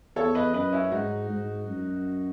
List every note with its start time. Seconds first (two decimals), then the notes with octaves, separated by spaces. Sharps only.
0.16 E2 A4 C#5
0.35 B4 D#5
0.54 F#2 B4 D#5
0.72 C#4 E4
0.92 G#2 D#4 F#4
1.30 G#2
1.68 F#2